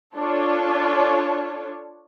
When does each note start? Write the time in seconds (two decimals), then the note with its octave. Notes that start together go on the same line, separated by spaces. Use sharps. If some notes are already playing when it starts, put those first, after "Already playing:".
0.16 D4 F4 A4 C#5